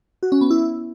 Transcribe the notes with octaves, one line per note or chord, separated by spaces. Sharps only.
F#4
C#4
B3
E4